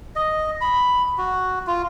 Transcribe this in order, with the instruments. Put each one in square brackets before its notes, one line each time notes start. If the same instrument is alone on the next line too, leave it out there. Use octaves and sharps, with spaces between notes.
[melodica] D#5
B5
F#4
F4